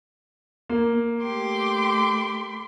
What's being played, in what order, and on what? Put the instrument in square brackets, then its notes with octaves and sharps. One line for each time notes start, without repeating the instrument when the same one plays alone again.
[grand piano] A#3
[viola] A3 C6 [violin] G4 D6